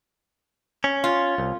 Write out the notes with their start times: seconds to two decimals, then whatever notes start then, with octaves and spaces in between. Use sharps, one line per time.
0.84 C#4
1.04 F4
1.38 C2